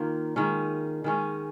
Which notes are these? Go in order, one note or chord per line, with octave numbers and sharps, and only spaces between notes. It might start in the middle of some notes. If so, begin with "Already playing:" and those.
Already playing: D#3 A#3 F4
D#3 G#3 C#4
D#3 G#3 C#4